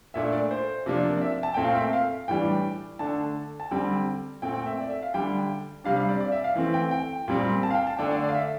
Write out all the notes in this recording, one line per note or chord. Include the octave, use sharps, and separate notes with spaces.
A#2 A3 D4 E5
D5
C5
C3 F3 A#3 D4
D5
E5
A5
A#2 A3 C4 G5
F5
E5
F5
A2 E3 G3 D4 G5
D3 A3 D4 A5
A5
D3 G3 C4 G5
A#2 A3 C4 G5
G5
E5
D5
E5
F5
D3 G3 D4 G5
C3 G3 D4 F5
F5
D5
D5
E5
F5
E3 A3 C4
G5
G5
A#2 G3 C4
A5
F5
G5
A5
D3 A3 D4 G5
D5
D5
F5
E5